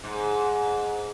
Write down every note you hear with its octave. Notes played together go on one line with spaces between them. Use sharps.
G#2